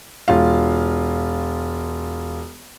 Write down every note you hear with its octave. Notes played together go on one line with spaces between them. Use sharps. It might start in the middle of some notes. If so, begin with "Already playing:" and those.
E1 F4 F5